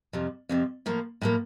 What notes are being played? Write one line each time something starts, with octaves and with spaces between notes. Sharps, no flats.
F2 C3 F3
F2 C3 F3
A2 F3 A#3
A2 F3 A#3